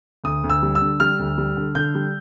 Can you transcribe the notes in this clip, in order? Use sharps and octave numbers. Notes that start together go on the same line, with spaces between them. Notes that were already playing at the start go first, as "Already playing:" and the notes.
D2 D#6
D2
E6
G3
E6
D3
G3 F6
D2
G3
D3
D3 G6
G3